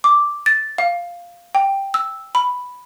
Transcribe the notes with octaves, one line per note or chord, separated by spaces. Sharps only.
D6
A6
F5
G5
E6
B5